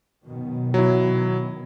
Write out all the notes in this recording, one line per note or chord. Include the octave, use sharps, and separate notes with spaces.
F#2 B2 D#3
F#3 E4